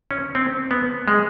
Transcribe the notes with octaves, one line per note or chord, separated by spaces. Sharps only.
C#4
C4
B3
G#3